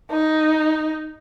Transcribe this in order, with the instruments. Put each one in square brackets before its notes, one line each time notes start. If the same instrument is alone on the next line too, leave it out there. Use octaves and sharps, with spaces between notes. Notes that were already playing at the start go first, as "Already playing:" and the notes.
[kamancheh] D#4